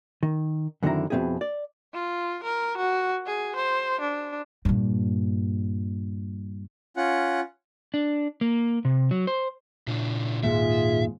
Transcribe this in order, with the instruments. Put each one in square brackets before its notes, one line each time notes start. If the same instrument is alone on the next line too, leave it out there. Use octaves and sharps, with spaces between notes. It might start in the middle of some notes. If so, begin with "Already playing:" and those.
[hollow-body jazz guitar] D#3
F#2 D3 D#3 C4 E4 A#5
F2 B2 D3 C4 E4 G#4
D5
[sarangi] F4
A#4
F#4
G#4
C5
D4
[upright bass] G2 A#2
[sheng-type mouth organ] C#4 F4 F#5
[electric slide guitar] D4
A#3
C3
F#3
C5
[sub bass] A#2 [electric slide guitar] C#3 D4 E4
[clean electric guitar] D#2 G#2 [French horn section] F4 G#4 [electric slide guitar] E5